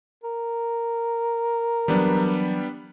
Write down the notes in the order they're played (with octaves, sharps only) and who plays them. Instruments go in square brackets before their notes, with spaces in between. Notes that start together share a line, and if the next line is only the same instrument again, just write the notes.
[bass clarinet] A#4
[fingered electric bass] E3 F#3 [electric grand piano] G3 B3 D4